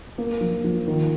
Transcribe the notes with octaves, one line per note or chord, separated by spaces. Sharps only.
A#3
F3
F3
D#3